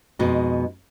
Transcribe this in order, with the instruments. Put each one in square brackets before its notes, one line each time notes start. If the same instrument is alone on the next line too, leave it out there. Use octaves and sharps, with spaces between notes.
[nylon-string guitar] F2 B2 G#3 D#4